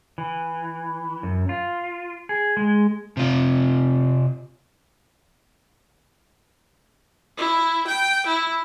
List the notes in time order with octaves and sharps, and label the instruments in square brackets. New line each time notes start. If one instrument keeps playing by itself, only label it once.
[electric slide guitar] E3
F#2
F4
G#4
G#3
[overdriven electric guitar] C3 F4
[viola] E4
G5
E4